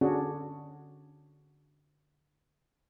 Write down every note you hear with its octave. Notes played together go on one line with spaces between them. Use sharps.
D3 C#4 D4 F#4 G#4